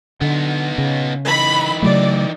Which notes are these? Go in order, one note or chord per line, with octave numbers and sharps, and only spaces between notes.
D3 B3 D#4
C#3
E3 D#4 B5
C#3 F#3 A3 D5